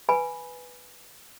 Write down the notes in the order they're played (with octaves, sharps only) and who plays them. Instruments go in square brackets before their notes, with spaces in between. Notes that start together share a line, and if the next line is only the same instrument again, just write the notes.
[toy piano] B4 G#5 B5